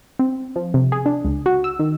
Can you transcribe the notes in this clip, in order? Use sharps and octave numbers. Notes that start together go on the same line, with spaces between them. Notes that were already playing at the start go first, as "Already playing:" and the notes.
C4
F3
C3
G#4
D4
C#2
F#4
E6
D#3